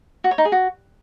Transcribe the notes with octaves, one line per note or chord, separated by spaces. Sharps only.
F#4
C#5
D#4
G#4
F#4